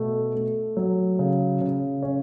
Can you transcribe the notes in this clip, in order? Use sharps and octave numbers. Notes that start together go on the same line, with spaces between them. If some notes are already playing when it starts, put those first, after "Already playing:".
Already playing: B2 A3
A3
F#3
C#3
C#3
C#4